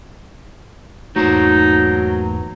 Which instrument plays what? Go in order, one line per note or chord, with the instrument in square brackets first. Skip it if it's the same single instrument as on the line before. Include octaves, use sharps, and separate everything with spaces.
[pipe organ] E2 G#2 E3 [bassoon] F#3 [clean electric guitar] A3 A#3 C5 [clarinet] D#4